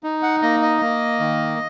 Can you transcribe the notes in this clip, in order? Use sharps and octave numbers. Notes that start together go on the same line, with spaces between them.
D#4
F#5
A#3 D#5
D#5
A#3
D#3